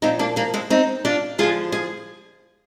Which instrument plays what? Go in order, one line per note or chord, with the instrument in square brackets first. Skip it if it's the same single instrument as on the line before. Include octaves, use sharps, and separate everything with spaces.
[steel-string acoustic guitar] A#2 C4 D#4
F3
A#3 D4
A#3 D4
G#3 C4
C4 D#4
D4 F4
D3 F3 F4 G#4
G#4